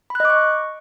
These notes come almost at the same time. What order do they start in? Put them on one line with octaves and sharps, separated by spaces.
B5 F#6 D#5 D6 C#6